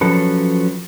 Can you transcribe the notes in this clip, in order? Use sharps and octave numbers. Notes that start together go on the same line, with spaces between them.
F3 F#3 C#4 A4 B4